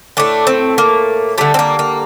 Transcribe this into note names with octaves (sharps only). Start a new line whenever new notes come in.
A2 A3 D4
C4
A#3
D3 G3 A3
C4
A#3
A#3